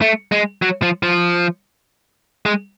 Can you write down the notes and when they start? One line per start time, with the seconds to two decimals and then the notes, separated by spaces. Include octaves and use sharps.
0.02 A3
0.32 G#3
0.62 F#3
0.82 F3
1.03 F3
2.46 G#3